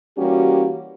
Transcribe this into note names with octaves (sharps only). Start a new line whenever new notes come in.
E3 G3 A#3 C#4 F#4 G4